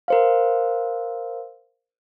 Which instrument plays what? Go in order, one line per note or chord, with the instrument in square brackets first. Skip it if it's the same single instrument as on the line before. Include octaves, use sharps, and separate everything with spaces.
[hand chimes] A#4 C5 F5